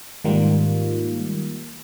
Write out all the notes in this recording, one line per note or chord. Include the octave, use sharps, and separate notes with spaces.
G#2 D#3 G3 A#3 F4